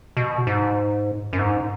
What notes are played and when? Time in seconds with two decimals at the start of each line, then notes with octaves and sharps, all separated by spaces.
0.17 B2
0.47 G#2
1.33 F#2
1.39 G#2